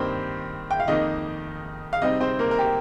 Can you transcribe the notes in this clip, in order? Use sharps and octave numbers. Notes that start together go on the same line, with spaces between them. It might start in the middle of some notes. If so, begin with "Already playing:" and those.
Already playing: G2 D#3 A#3 C4 C5
G5
F5
F2 D#3 A#3 D#4 D#5
F5
C3 G3 C4 D#4 D#5
C4 C5
A#3 A#4
A#4
G4